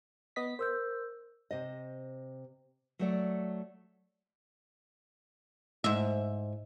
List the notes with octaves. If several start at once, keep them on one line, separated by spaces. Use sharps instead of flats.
B3 D#5 B6
A#4 C5 E6 G6
C3 C5 D#5
F#3 A3 D5
G#2 E5